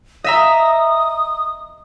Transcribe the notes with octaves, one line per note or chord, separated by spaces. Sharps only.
D#5 E5 A#5 D#6